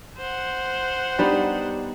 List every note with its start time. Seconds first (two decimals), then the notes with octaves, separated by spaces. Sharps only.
0.17 C5 F#5
1.19 G3 B3 D4 D#4